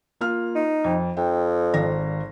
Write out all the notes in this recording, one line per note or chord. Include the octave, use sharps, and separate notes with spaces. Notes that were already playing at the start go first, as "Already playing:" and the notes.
A#3 F4 F6
D#4
F2
F2 G5
G#1 D5 A#6